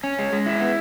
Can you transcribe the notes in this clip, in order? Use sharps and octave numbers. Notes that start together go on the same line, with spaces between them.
C#4
G#3
G#3
E4
B3